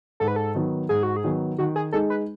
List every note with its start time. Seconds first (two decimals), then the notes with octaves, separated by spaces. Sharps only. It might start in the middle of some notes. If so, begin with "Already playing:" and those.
0.20 G#2 A4
0.28 B4
0.36 A4
0.55 D#3 F#3 B3
0.89 G#2 G#4
1.03 F#4
1.16 G#4
1.24 D#3 F#3 B3
1.59 D#3 F#4
1.76 G#4
1.92 G#3 D#4 G#4 A4
2.10 B4